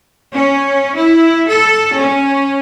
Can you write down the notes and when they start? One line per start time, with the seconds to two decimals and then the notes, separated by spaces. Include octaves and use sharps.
0.34 C#4
0.96 E4
1.48 A4
1.96 C#4